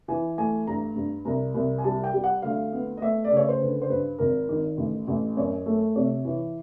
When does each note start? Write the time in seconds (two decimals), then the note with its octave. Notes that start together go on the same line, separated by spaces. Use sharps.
0.08 E3 G#5
0.38 A3 G#5
0.67 G2 A#5
0.96 G2
1.25 C2 A#5
1.54 C2
1.78 G#5
1.84 G3 A5
2.04 G5
2.14 G3
2.24 F#5
2.42 D2 F5
2.73 B3
2.97 D#5
3.01 A3 E5
3.24 D5
3.31 C#3
3.37 C#5
3.49 C5
3.61 D3 B4
3.82 C5
3.89 G2 B4
4.19 G#1 A#4
4.49 D#3
4.77 A1
5.07 A1
5.37 F#2 C#5
5.66 A3
5.96 C3 C#5
6.25 E3